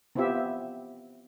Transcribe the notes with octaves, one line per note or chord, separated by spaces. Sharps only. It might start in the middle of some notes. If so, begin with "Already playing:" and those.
B3 C4 E4 F4 G4 E5